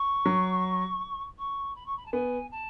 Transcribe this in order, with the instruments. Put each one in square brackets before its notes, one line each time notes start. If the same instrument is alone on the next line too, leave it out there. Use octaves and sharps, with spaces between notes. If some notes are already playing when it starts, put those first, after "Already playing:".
Already playing: [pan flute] C#6
[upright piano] F#3
[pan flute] C#6
B5
C#6
B5
A5
[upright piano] B3 [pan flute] G#5
[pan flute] A5